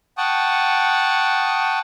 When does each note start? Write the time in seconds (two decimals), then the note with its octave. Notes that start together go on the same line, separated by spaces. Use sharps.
0.18 F#5 G5 A5 C#6 D#6